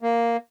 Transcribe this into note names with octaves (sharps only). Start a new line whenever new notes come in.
A#3